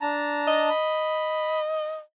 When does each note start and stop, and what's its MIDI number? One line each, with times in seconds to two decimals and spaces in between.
0.01 0.69 62
0.01 0.69 81
0.01 0.69 82
0.48 2.00 75
0.70 1.60 83